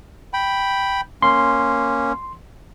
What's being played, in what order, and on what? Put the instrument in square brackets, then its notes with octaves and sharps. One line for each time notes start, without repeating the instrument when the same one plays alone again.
[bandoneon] G5 B5
[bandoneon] A#3 C#4 [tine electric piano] C6